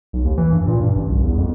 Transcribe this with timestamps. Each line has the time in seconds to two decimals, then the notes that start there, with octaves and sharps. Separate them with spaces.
0.13 B1
0.25 D#2
0.38 E3
0.52 G2
0.67 A#2
0.80 G2
0.96 A1
1.10 C2
1.24 E2
1.38 F2